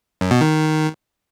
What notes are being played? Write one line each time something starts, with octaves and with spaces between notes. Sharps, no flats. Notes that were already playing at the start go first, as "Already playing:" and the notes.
F#2
B2
D#3